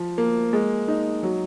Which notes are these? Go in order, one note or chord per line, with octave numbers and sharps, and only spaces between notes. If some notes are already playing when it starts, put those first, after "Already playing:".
Already playing: F3
A#3
G#3
D#4
F#3